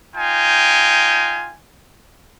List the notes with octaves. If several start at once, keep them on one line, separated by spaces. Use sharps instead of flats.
D#4 F4 G5 G#5